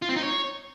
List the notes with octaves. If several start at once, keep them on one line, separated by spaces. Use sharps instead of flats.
F4
C4
D#4
C#5